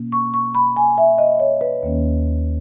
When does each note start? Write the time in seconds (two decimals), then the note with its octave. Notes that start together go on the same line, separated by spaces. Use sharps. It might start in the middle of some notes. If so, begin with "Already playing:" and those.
Already playing: B2 A#3 C#4
0.12 C#6
0.34 C#6
0.55 B5
0.76 G#5
0.98 E5
1.18 D#5
1.40 C#5
1.61 B4
1.83 D#2 D#3 A#3 C#4